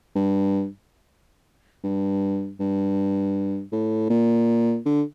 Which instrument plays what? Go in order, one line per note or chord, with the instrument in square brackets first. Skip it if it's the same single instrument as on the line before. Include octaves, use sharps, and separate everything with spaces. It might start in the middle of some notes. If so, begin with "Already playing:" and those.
[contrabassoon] G2
G2
G2
A2
A#2
D3